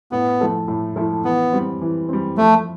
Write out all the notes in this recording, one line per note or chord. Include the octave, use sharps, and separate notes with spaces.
A2 B3
F3 A3 E4 A4
A2
F3 A3 E4 A4
E3 B3
G3 C4
E3
G3 C4
F3 A3